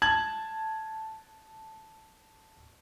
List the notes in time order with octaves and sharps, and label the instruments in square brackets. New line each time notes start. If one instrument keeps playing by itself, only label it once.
[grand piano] A5 G#6 F#7